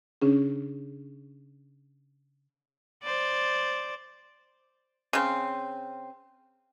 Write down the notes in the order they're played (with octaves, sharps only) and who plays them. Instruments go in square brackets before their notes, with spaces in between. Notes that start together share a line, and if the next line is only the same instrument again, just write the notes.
[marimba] C#3 C#4 D4 G#4
[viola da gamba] C5 D5
[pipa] C#3 C4